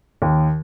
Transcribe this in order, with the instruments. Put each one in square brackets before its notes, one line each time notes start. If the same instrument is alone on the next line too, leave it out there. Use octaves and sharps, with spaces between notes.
[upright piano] D#2